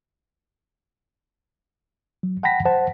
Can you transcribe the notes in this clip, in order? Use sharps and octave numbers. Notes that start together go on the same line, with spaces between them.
F#3
F#5 G5 A5 B5 A#6 B6
C5 F#5 A5